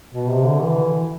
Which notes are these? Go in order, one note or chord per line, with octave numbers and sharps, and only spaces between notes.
B2
C3
D3
E3